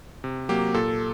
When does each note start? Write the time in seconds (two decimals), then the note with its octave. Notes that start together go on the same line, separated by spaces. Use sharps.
0.24 C3
0.49 F#3 A#3 G4
0.74 A#2 A4